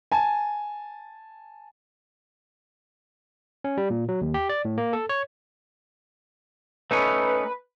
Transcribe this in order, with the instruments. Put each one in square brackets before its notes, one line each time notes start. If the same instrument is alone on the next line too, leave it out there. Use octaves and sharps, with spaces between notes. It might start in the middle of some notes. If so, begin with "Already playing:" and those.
[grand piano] G#5 A5
[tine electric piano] C#4
G3
A#2
F#3
D#2
G4
D5
A2
A#3
A4
C#5
[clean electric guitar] A3 C#4 D#4 [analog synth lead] B4